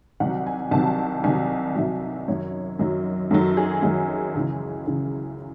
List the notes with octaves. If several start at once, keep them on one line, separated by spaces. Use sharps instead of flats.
C2 C3 D#3 F#3 F#5
G#5
C2 C3 D#3 F#3 A5
C2 C3 D#3 F#3 G#5
C2 C3 D#3 F#3 E5
F#2 D#3 F#3 C#5
F#2 D#3 F#3
F#2 D#3 F#3 A4
G#4
F#2 D#3 F#3 G#4
C#2 C#3 E3 G#4
C#2 C#3 E3